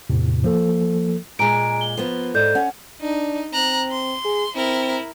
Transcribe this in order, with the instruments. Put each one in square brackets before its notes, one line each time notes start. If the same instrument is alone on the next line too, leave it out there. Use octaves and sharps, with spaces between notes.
[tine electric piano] E2 A2 C3
F3 A#3 A4
[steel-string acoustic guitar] A#2 G#3 [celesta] G#5 A#5 D7
[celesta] G7
[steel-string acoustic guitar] F3 A#3 B3
[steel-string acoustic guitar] G#2 [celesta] A4 D5 G6
[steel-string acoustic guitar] C#4 [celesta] F#5
[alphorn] D4 [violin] D#4
[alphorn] C4 [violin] A#5 F#6
[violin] C6
[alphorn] G#4
[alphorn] C4 [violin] E4 A#4